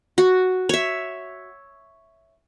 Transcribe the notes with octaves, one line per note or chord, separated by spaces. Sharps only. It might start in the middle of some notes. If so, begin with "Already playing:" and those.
F#4
C#5 E5